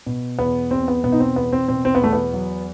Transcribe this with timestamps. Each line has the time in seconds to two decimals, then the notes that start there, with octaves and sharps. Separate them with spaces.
0.06 B2
0.39 E2 B3
0.71 E2 C4
0.88 B3
1.04 B2 B3
1.12 D#4
1.20 C4
1.36 E2 B3
1.53 C4
1.68 B2 C4
1.85 C4
1.95 B3
2.01 E2 A3
2.13 B3
2.33 F#3